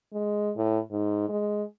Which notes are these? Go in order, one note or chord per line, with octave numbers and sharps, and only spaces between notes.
G#3
A2
G#2
G#3